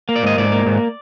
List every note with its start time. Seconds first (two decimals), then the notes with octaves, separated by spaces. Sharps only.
0.09 A#3
0.16 D5
0.23 G#2 D#5
0.38 G#2 D5
0.52 A#3
0.66 G#2